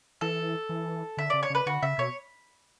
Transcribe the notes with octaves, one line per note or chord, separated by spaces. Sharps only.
E3 A4
E3
D3 E5
C#3 D5
C#5
C#3 B4
D3 F#4
C#3 E5
B2 C#5